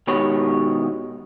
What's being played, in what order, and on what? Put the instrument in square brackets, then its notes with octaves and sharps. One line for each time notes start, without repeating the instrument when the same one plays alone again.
[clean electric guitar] B2 D#3 G#3 G4 C#5 B5